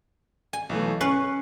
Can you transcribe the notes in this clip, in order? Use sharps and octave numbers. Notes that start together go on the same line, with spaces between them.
G#5
B1 E3 A3
C#4 B4 C#6 F#6 C7